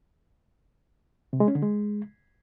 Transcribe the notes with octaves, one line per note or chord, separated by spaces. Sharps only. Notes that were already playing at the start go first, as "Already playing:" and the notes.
C3
G#3
C#4
D3
G#3